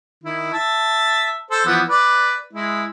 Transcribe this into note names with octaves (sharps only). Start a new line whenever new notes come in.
D#3 E4
E5 A5
A4 C5
E3 F3 B3
B4 D5
G#3 E4